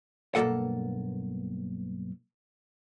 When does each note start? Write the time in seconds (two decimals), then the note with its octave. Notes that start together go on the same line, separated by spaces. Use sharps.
0.35 B1 G2 C3 A#3 A4 F#5